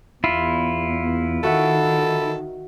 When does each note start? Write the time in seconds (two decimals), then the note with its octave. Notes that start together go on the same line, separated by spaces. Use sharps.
0.24 E2 E4 F4
1.43 D#3 F#4 A4 E5 F#5